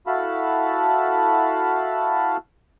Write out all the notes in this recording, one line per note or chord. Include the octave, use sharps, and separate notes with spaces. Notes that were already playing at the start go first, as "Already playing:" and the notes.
E4 F#4 A4 F5 A5 B5